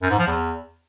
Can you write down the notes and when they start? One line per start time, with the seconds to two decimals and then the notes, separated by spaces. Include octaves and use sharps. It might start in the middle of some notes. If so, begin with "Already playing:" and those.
0.02 F#2
0.11 G#2
0.19 F3
0.27 E2